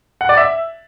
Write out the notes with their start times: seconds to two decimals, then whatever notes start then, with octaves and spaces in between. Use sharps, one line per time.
0.21 F#5
0.29 D5
0.37 E5